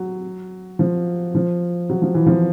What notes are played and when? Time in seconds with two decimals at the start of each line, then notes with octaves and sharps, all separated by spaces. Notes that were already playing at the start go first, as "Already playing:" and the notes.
Already playing: F#3
0.79 F3
1.35 F3
1.89 F#3
2.02 F3
2.14 E3
2.26 F3